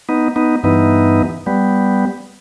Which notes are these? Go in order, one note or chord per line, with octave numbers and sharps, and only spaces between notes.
B3 D#4
B3 D#4
G2 E3 B3 D#4
G3 B3